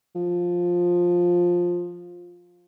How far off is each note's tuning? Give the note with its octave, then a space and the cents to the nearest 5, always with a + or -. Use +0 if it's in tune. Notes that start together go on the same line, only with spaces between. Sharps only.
F3 +10